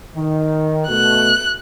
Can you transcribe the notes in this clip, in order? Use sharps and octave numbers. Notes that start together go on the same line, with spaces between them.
D#3
B2 A3 F#6